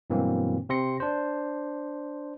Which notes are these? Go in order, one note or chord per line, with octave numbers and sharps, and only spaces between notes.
G2 B2 E3 F#3 A#3 C4
C3 C4 C6 A#6 C#7
D4 C5